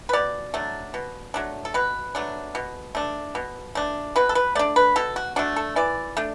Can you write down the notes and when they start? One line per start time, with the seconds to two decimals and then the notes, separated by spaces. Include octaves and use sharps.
0.09 B4
0.13 B2 D5
0.54 F#3 A3 D4
0.94 B2
1.34 F#3 A3 D4
1.65 A4
1.74 B2 B4
2.15 F#3 A3 D4
2.55 B2
2.95 A3 D4
3.35 B2
3.75 A3 D4
4.16 B2 B4
4.29 A4
4.35 B4
4.55 A3 D4 D5
4.76 B4
4.96 B2 A4
5.16 F#4
5.36 A3 D4 F#4
5.56 A4
5.76 E3 D5
6.17 A3 D4